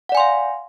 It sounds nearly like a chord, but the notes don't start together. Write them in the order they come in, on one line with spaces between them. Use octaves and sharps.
F#5 D5 G#5 C6 F5